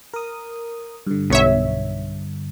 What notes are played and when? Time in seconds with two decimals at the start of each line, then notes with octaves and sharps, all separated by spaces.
0.13 A#4 D#6
1.07 G2 D3
1.30 B1 C#5 E5